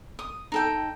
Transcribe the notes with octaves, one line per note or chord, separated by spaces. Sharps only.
D#6
D#4 A4 G5